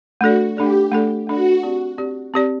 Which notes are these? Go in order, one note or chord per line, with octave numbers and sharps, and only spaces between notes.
A3 D4 F#4 A4 D5
A3 D4 G4 A4 D5
A3 D4 A4 D5
A3 D4 F#4 A4 D5
C4 G4 D5
C4 G4 D5
C4 G4 D5